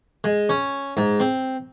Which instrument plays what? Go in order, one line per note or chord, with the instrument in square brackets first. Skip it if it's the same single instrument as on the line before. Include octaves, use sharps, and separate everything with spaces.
[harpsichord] G#3
C#4
G#2
C4